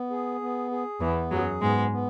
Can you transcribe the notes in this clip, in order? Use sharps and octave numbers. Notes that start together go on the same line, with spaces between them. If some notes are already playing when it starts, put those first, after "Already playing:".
Already playing: B3
G#4
B3
G#4
E2 E3 B3
F#2 F#3 G#4
G#2 G#3 B3
B3